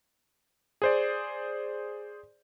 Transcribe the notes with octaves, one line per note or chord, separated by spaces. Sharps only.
G#4 C5 D5